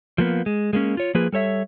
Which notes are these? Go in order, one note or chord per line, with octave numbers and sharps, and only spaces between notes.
F3 A#3 B3
G#3
G#3 A#3 C#4
F4 C#5
F3 A#3 F4 G#4 B4
G3 A4 C#5 E5